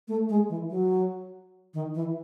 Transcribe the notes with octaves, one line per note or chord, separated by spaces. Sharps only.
A3
G#3
E3
F#3
D#3
E3